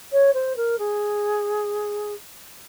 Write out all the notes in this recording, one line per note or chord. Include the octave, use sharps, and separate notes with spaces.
C#5
C5
A#4
G#4